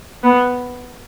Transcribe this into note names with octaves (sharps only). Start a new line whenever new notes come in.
B3